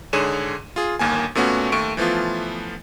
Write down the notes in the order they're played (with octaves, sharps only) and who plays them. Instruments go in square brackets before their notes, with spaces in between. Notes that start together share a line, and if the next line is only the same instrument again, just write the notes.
[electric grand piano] G#2 D3 G#4 C#5 D#7 E7
F4 G#4
G1 D#2 A#3 G#5
A#2 A3 B3 C#4 F#4
D#2 A3 C#6 D7
E3 F3 A3 B3 F4